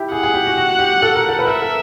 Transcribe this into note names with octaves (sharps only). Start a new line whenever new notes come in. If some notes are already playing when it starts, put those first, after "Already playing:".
Already playing: E4 G4
G#4 F#5
G#4
G4
F#4
F#4
G4
A4
A#4
A4
B4
A#4 E5
A4